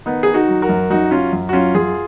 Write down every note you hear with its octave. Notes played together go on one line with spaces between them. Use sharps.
D#3 B3 D#4
D#3 G#4
D#4 F#4
F#3
F#4 A#4
F#2
F#2 D#4 F#4
F#3 C#4 F4
F#2
F#4
F#3 C#4 F4
F#2 F4 G#4